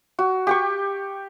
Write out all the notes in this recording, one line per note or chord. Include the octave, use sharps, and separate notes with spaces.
F#4
G4 G5 C#6